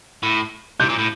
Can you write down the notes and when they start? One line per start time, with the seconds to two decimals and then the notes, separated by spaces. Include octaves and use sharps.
0.23 A2
0.80 C3 G6
0.89 A#2
0.98 A2